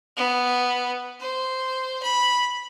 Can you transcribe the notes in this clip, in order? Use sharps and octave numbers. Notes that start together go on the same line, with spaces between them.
B3
C5
B5